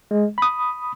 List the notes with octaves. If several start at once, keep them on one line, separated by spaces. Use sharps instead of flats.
G#3
B5 D#6